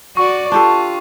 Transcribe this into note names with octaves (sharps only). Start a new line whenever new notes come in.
F#4 D5 C#6
D4 F4 G4 A4